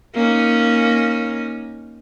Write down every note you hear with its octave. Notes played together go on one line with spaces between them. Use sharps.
A#3 C#4 D#4